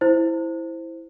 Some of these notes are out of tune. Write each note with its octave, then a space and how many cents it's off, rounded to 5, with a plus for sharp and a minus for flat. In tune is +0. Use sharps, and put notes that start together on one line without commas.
E4 +0 C5 +0